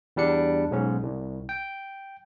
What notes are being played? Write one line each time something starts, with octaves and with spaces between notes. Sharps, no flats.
E2 G3 D4 C#7
B1 G#2 C#4
C2
G5